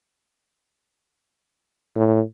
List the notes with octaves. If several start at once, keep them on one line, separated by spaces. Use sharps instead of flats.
A2